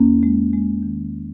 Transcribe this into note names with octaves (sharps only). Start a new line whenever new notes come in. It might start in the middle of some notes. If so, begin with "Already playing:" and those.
Already playing: E2 A#3 C#4
G#3
G#3
D#3